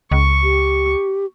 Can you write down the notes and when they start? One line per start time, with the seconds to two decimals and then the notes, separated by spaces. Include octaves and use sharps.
0.12 C#2 C#6
0.43 G4